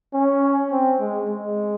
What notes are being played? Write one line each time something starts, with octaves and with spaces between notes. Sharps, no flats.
C#4
C4
G#3
G#3